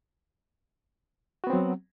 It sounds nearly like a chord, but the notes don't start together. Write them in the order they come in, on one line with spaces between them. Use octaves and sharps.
F#4 B3 C4 F#3